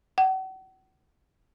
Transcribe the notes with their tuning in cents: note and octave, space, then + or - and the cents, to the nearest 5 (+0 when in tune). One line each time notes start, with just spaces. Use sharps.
F#5 +40